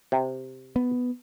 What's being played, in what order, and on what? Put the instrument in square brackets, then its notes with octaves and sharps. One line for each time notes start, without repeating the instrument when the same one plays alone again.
[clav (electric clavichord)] C3
[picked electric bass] B3